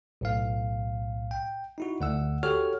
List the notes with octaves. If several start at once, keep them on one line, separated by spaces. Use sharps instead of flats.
B1 A2 F5
G5
D#4 E4 F#4
D2 F#5 E6
F#4 G4 A4 C#5 F6